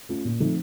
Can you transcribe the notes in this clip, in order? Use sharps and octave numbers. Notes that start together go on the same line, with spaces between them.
A3 C#4 F4
A#2
F3 A3 C4 D#4